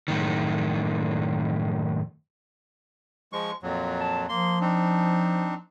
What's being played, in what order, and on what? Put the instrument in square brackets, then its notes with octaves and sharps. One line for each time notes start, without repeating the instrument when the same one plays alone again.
[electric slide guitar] F#2 A2 D#3
[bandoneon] F3 G#3 C#6
F2 A#2 F#3
[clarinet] A5
[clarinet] F3 [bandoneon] A#3 C6
[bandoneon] C4 D4 D#4